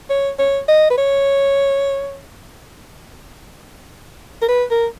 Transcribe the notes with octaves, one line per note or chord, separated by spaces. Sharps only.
C#5
C#5
D#5
B4
C#5
A#4
B4
A#4